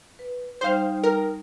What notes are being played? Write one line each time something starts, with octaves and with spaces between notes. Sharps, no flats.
B4
G3 D#4 C5 F5 G5
A#4